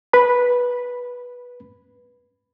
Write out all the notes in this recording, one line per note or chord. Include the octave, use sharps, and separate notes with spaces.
B4 B5